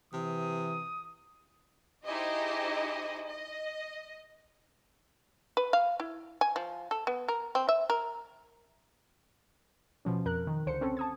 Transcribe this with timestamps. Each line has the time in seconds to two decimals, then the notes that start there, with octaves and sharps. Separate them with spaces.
0.13 C3 E3 D#6
2.04 D#4 E4 G4 G#4 C5 D#5
3.28 D#5
5.57 B4
5.73 F5
6.00 E4
6.41 G#5
6.56 F3
6.91 A4
7.07 B3
7.28 A#4
7.55 C4
7.69 E5
7.90 A#4
10.05 B2 F3 C#4
10.25 F2 A#4 F#6
10.47 D#3
10.66 C#2 D3 C5 C#7
10.81 C4 C#4 A4
10.97 A5 D#6 G#6